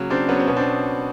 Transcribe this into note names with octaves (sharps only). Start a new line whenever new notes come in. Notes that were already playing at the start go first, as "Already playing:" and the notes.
Already playing: C#3 F#3 A#3
C#3 C4 D4
F#3 B3 C#4
C4
B2 B3 C#4
C4 D4